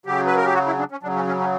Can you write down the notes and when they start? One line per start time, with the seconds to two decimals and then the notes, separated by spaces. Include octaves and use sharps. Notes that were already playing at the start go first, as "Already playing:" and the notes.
0.06 C#3 F#3 G4
0.26 B4
0.37 A#4
0.45 G4
0.54 F#4
0.67 E4
0.79 D4
0.91 C#4
1.03 C#3 F#3 D4
1.16 C#4
1.27 C#4
1.40 C#4